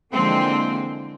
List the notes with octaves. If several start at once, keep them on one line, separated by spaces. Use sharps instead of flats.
D3 E3 F3 G#3 A#3 C4